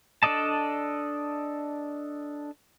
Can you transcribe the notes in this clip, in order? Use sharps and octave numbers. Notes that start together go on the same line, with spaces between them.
D4 A4 D5 D#5 A5